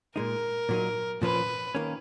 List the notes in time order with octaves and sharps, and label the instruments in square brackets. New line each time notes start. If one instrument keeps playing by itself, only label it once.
[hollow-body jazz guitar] A#2 G#3 D#4 [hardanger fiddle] A#4
[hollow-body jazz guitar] A#2 F#3 A#3 D#4
[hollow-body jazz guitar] A#2 F3 A#3 C#4 [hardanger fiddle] B4
[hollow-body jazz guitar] D#3 A#3 C#4